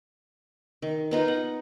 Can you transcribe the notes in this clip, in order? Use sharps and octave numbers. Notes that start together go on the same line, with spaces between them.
D#3
B3 D#4 F4
F#5